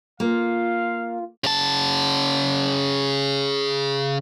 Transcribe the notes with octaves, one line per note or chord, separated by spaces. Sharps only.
A#3 F4 F5
C#3 A5